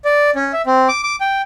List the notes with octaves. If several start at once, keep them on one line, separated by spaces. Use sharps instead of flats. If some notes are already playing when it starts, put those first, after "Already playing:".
D5
C#4
E5
C4
D6
D6
G5